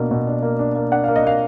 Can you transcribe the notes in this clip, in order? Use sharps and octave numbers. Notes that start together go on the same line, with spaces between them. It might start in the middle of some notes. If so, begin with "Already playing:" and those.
Already playing: B2 A#3 D4
B2
D4
A#3
D4
A#3
D4 F#5
A#3 F5
D#5
A#3 F5